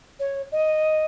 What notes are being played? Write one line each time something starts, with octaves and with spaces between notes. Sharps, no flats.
C#5
D#5